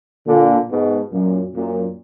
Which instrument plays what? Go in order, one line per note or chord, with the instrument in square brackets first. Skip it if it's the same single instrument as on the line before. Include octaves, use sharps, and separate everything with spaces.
[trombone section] A#2 D3
G#2 B2
F#2 A#2
F#2 A#2